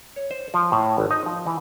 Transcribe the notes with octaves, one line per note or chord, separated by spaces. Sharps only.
C#5
C5
F3
A2
G#1
D#4
F3
E3